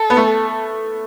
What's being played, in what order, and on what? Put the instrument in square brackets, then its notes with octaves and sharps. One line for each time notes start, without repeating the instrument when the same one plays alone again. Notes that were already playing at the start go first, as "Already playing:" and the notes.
Already playing: [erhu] A4
[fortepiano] B3
A3